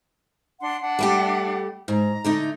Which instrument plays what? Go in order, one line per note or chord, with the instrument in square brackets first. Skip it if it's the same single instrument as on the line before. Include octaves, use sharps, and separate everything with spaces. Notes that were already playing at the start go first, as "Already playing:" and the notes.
[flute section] D4 F#5 C6
D4 F#5
[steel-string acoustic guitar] G3 A3 G4
[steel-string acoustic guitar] G#2 [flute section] A#5
[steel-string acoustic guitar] D3 A3 D#4